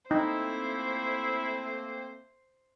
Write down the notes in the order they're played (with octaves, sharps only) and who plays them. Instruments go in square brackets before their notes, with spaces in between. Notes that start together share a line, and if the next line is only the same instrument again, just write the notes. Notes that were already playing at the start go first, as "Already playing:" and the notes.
[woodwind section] A3 A#3 C4 [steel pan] D#4 [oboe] E4 [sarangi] C5